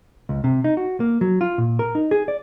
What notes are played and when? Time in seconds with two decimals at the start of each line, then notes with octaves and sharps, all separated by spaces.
0.29 C#2
0.44 C3
0.64 D#4
0.77 F#4
1.00 A#3
1.21 F#3
1.41 F4
1.58 A#2
1.79 A#4
1.95 D#4
2.11 G#4
2.28 D5